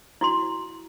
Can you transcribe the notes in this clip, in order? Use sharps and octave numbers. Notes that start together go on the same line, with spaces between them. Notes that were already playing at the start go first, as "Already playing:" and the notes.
E4 F#4 C6